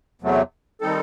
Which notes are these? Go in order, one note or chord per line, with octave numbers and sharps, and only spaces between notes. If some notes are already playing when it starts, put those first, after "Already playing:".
E2 C3 F#3 A3
D#3 G3 C4 D#4 A4